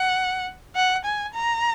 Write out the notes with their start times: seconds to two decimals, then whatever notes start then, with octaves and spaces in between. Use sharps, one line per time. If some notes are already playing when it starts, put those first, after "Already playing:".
Already playing: F#5
0.76 F#5
1.05 G#5
1.34 A#5